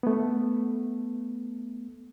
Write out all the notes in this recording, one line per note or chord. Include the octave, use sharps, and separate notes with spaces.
A3 B3